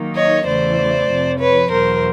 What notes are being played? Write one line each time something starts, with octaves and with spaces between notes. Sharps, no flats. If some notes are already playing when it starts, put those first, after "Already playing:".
Already playing: D#3 F#3 A#3 D#4
C#5 D#5
E2 C#3 E3 A3 C5 D5
F2 C3 F3
B4 C#5
E2 B2 F#3 A#4 C5